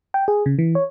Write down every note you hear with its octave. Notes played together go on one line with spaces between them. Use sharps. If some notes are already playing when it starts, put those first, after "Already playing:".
G5
G#4
C#3
E3
C#5